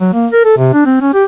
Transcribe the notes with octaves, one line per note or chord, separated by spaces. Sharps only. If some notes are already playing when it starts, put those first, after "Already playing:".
F#3
A#3
A#4
A4
C3
D4
C4
C#4
G4